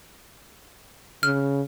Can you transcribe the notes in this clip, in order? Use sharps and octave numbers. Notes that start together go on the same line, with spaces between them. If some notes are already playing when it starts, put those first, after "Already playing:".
C#3 F6